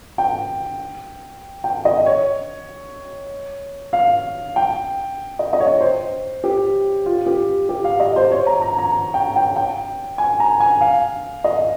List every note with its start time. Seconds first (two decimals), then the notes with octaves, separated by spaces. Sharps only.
0.18 G5
1.64 G5
1.85 D#5
2.06 C#5
3.93 F5
4.56 G5
5.39 D#5
5.53 D#5
5.60 C#5
5.81 C5
6.44 G4
7.06 F4
7.26 G4
7.69 G4
7.84 F5
8.00 D#5
8.16 C5
8.32 C#5
8.46 A#5
8.62 A#5
8.78 A#5
9.14 G5
9.36 G5
9.56 G5
10.18 G#5
10.40 A#5
10.60 G#5
10.81 F5
11.44 D#5